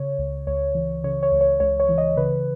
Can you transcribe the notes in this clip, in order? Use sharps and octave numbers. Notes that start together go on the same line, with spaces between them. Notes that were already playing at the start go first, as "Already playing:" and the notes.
Already playing: C#3 C#5
C#2
C#2 C#5
E3
C#3 C#5
C#5
C#2
C#5
C#2 C#5
C#5
E3
D#5
C#3 B4